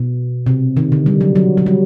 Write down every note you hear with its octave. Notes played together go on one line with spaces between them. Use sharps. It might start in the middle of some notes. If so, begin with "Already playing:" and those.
Already playing: B2
C3
D#3
D3
G3
F#3
F#3
F#3
G3